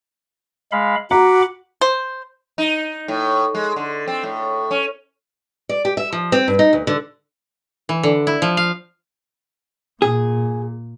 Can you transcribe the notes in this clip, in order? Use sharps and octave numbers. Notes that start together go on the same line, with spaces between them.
G#3 F5 B5
F#4 F#5 A#5 B5 D6
C5
D#4
A2
G#3
D3
C4
A2
C#4
D5
G4
E5
F3
C4
G2
D#4
D2
D3
E3
D3
E4
F3
F5
A#2 G#4